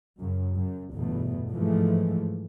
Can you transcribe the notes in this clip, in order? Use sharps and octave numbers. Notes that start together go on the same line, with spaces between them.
F#2 C#3
F#2
G1 E2 B2 A3
G#2 E3 F3 G#3 A3